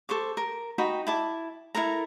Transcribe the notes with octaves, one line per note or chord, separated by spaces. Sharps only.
A4 C5 C#6 D6
A#4
D#4 F#4 G5 B5
E4 A5 D6
E4 A4 A#4 A#5